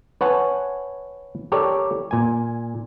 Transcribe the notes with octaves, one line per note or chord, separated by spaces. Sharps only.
B4 C#5 F#5 G#5 A5
G4 A4 A#4 C#5 D5
A#2 G#5